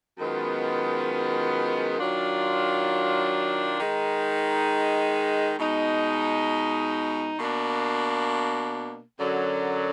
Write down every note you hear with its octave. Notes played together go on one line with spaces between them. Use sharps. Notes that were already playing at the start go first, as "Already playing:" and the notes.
F#2 D#3 G#3 B3 F4
D#3 F#3 D4 F4
D#3 G#3 D#4
B2 G#3 D#4
B2 A#3 D4
F#2 D3 F#3